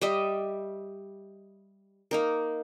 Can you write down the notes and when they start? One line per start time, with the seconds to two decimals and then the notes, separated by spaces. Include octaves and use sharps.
0.01 G3 G4 D#5 E5
2.11 A#3 D#4 A#4